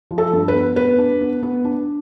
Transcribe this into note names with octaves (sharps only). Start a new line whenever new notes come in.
F3
A4
G2
B4
B3
B3 B4
D4
B3
B3
D4